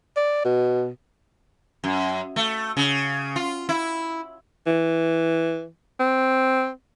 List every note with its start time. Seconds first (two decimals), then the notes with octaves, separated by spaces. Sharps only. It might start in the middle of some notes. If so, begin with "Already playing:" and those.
0.17 D5
0.45 B2
1.84 F#2
2.36 A3
2.77 C#3
3.36 F4
3.69 E4
4.66 E3
6.00 C4